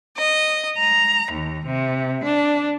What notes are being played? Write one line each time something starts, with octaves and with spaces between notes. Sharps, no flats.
D#5
A#5
D#2
C3
D4